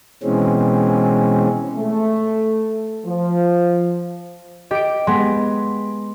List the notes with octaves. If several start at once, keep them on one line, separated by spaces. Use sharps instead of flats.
B2 E3 G#3 C4 C#4
A3
F3
G4 D#5 D7
G#3 B3 C6